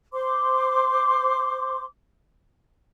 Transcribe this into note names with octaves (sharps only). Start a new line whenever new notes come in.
C5 C6 D6